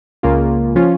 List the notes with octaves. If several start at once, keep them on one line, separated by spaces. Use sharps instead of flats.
C#2 C#3 A#3 F4
F3 C#4 F4